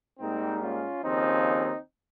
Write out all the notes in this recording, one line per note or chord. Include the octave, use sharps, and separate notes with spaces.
G#2 G3 A#3 C4 D#4
C#4 F4
D#2 C#3 F3 C4 D#4